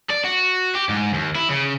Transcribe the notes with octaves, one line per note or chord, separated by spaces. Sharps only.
D5
F#4
G4
G#2
D#2
E4
C#3